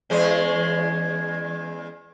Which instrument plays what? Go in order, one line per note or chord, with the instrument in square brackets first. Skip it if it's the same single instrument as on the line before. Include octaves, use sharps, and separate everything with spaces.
[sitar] E2 G#3 C#4